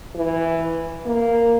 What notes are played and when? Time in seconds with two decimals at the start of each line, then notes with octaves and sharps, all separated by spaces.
0.15 E3
1.05 A#3